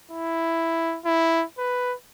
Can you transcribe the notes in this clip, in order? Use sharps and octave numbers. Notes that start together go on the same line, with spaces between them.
E4
E4
B4